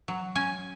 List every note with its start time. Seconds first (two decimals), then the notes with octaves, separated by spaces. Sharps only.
0.08 F#3
0.35 C#4 G#5